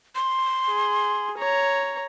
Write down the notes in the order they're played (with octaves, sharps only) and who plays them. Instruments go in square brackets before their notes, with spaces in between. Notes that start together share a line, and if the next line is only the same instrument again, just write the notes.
[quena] C6
[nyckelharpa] G#4
C#5 A#5